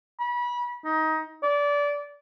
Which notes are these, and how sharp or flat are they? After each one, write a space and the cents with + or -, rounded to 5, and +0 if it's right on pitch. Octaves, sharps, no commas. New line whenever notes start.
B5 -30
D#4 +20
D5 -25